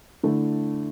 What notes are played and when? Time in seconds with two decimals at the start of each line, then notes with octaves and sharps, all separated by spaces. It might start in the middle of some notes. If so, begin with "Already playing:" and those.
0.23 D3 A3 E4